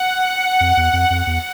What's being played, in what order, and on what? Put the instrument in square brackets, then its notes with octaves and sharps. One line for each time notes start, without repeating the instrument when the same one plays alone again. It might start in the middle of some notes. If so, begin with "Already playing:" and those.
Already playing: [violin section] F#5
[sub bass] F2
E2
F2
F2
E2